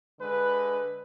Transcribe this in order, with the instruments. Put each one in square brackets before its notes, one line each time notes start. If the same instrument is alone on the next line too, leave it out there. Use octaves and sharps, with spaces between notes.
[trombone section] D3 G#3 B4